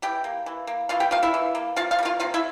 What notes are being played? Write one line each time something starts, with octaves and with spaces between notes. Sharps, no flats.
E3 G4 G5
A#3
E3
A#3
E3 F4 F5
G4 G5
A#3 F4 F5
E4 E5
E3
A#3
C3 F4 F5
F4 F5
G3
A#3 F4 F5
C3 F4 F5
E4 E5